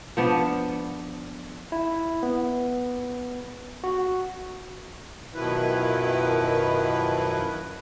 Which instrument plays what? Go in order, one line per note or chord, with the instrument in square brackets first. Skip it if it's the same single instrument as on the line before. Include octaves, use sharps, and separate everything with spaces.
[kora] F3 B3 D4
[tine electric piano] E4
B3
F#4
[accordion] F#2 B2 D#3 F3 E4 B4